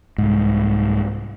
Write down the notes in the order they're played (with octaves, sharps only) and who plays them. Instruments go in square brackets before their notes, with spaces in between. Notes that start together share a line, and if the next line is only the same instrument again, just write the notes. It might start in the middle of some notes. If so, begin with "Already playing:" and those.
[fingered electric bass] C2 G#2